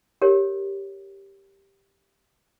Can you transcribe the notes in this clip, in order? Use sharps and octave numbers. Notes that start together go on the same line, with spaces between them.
G4 A#4 C#5